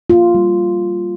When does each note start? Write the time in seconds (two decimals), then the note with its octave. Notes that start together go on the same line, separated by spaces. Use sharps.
0.10 A#3 F4
0.35 G3